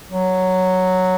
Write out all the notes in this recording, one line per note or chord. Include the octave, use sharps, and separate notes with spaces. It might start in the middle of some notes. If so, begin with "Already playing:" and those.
F#3